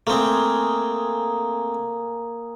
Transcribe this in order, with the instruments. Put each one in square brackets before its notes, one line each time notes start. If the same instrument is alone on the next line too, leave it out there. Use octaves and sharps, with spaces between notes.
[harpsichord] A3 C4 [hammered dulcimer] A#3 G#4